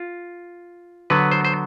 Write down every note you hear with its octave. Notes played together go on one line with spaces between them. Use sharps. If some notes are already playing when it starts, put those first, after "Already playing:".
Already playing: F4
D3 F#3 B3 B4
C5
C5